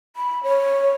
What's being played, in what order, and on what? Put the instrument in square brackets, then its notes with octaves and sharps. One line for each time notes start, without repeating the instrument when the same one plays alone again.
[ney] B5
C#5